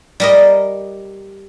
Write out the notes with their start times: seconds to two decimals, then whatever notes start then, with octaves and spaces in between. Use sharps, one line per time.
0.20 G3 A#4 D#5